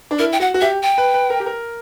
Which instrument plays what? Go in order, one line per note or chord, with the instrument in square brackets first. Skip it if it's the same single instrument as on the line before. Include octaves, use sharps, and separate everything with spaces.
[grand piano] D4
[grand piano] E4 [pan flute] A#4
[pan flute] G5
[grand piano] F#4 [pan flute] F#5
[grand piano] F#4
[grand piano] G4 [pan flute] E5
[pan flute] G5
[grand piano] B4
B4
A#4
G4
A#4